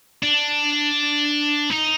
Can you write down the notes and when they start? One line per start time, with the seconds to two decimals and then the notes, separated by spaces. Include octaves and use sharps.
0.23 D4
1.70 D#4